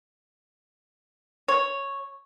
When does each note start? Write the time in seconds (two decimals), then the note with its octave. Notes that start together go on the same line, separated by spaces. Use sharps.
1.48 C#5